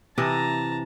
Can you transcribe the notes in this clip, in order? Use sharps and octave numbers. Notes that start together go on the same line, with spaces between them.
C3 E3 D#5 A5 A#5